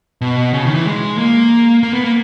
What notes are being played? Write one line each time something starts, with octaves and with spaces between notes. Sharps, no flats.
B2
C#3
D#3
E3
G#3
A#3
A#3
B3
A#3